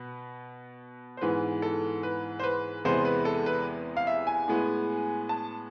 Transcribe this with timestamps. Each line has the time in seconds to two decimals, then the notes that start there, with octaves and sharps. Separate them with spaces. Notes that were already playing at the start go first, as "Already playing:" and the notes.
Already playing: B2 B3
1.17 C5
1.21 G#2 E3 G#3 B3 B4
1.62 A4
2.03 B4
2.39 C5
2.43 B4
2.85 E2 C3 G#3 B3 C5
3.05 B4
3.25 A4
3.46 B4
3.97 F5
4.07 E5
4.27 G#5
4.48 A2 G#3 B3
5.29 A5